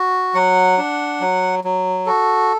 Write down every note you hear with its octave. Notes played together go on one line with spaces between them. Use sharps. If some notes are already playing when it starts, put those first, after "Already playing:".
Already playing: F#4
F#3 F#5
D4
F#3
F#3
F#4 A4